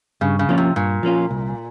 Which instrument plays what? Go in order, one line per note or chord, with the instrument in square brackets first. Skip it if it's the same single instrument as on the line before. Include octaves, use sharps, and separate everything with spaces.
[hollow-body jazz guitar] G2 [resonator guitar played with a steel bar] C#3
[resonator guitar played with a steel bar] C#3
[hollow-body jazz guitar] F3 A#3 C#4 F4
[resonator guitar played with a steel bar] C3
[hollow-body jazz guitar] G2 [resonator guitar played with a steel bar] A#2
[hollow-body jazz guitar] F3 A#3 C#4 F4
C2